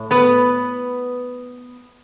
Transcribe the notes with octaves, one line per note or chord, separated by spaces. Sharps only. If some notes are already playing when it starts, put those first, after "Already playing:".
Already playing: A2
B3 B4